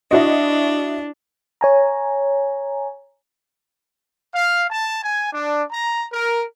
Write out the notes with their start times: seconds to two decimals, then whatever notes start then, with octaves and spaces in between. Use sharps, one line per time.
0.11 D4 E4 F#4 D#5
1.61 C#5 G#5 A#5
4.34 F5
4.70 A5
5.04 G#5
5.33 D4
5.71 A#5
6.12 A#4